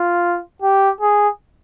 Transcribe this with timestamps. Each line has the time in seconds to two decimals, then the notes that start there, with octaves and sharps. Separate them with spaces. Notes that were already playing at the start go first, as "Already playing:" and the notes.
Already playing: F4
0.62 G4
1.01 G#4